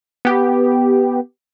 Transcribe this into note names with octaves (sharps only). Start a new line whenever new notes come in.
B3 G4